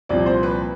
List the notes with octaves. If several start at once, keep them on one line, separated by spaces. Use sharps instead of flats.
C2 A#2 F3 D5
C5
B4